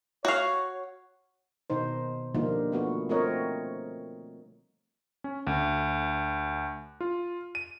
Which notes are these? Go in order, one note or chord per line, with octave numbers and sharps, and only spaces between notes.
F#4 C#5 F5
B2 D#3 D#4 C5
D3 F3 G3 A#3 D#4 F4
A3 B3 F#4
A3 C4 F4 A#4 C#5 D#5
C#4
D2
F4
D#7